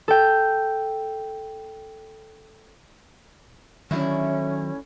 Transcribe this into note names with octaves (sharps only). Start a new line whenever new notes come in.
A4 G5
A2 D3 D#3 F#3 C#4 E4